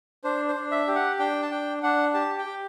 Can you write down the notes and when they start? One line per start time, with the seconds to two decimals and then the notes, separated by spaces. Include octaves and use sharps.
0.24 D4 C5
0.48 C5
0.56 D4
0.72 E5
0.88 G4
0.95 F#5
1.19 D4 G5
1.42 A5
1.51 D4 G5
1.83 D4 F#5
2.14 G4 A5
2.38 G5
2.45 G4